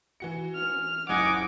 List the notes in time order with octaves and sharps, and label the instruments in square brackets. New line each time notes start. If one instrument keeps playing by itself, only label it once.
[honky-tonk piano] E3 F#4 C#7
[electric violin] F6
[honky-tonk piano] F#1 C#2 G#6 [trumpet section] D#5 F#5 G#5 [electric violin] D6